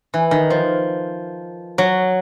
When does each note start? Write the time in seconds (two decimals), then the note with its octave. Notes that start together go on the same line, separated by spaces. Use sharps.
0.14 E3
0.31 D#3
0.50 F3
1.78 F#3